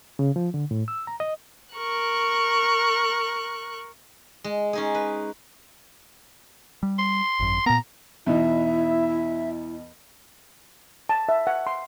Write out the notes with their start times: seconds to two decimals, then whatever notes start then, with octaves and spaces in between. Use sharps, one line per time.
0.19 C#3
0.36 F3
0.54 D3
0.71 A2
0.88 E6
1.07 A#5
1.20 D#5
1.75 A#4 C#6 F#6
4.44 G#3
4.73 C#4 D#4 G#4
4.94 B4
6.83 G3
6.98 C6
7.39 G#1 F#2
7.66 A#2 B3 A#5
8.26 E2 B2 D#4 E4 E5
11.09 A5
11.29 E5
11.47 F#5
11.67 C6